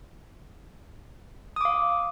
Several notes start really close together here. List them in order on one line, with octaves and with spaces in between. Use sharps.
D#6 D6 F5